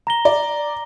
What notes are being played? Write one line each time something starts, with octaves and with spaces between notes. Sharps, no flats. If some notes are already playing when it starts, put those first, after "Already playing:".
A#5 A#6 G7
D5